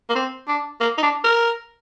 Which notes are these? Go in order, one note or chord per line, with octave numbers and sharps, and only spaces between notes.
A#3
C4
D4
A#3
D#4
D4
A#4